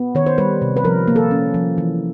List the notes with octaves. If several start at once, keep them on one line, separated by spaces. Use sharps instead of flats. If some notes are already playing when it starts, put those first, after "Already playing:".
Already playing: B3
D#3 C#5
C5
G3 B4
C3
B4
F3 A#4
A#3
A4
C#4
F3
E3